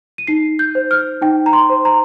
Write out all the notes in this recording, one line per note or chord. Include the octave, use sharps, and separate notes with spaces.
D#7
D#4 C7
G6
C5
F6
D#4 G5
A#5
C6
C5
A#5